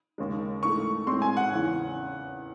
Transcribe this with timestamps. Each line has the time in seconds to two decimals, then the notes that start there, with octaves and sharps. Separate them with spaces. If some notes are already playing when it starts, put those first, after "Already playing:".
0.18 D#2 C#3 G#3
0.63 G#2 E3 A3 C#6
1.07 A2 G#3 C4 C6
1.22 G#5
1.37 F#5
1.51 E2 C#3 E3